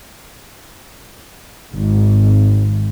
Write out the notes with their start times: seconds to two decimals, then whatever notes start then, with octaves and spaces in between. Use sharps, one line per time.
1.72 G#1